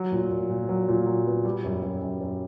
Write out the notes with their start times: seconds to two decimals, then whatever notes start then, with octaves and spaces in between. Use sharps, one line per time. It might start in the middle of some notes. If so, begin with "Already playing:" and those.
Already playing: F#3
0.12 A#2
0.30 A#2
0.50 A#2
0.69 F#3
0.88 A#2
1.06 F#3
1.26 B3
1.45 G3
1.64 F#2
1.83 F#2
2.02 F#2
2.21 F#2